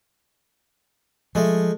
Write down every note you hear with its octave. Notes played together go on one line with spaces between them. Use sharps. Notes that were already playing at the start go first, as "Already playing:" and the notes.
F3 G#3 A3